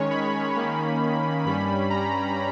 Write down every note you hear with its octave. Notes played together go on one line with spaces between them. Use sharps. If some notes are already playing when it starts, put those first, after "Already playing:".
Already playing: D#3 G#3 C#4 C#5
B5
D#3 A#3 C#4
G2 G3 C#4 B5
A#5